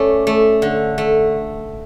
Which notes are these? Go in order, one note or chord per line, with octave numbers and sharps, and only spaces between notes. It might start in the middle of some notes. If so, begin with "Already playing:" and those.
Already playing: A3 C#4 D5
A3
D3
A3